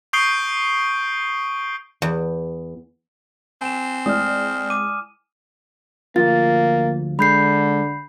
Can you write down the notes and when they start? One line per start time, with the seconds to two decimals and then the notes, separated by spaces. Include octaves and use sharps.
0.13 C#6 D#6 G6 C7 D7 G7
2.02 E2
3.62 C4 G#5 E7
4.06 G#3 E4 D5 D#6 F6
4.70 D6 D#7
6.16 D2 F3 A#3 F4 A6
7.19 D3 G#3 B5 G6 C7